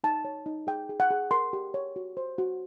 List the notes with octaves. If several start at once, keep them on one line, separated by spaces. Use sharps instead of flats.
D#4 A5
C#5
D#4
G#4 G5
G#4
F#5
G#4
A#4 C6
G4
C#5
F#4
C5
F#4